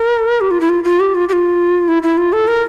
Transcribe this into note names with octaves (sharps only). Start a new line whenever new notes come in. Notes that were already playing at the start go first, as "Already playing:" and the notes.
Already playing: A#4
G4
F4
E4
F4
F4
G4
F4
G4
F4
E4
E4
F4
A4
A#4